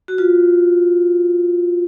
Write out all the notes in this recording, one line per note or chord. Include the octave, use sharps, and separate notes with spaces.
F#4
F4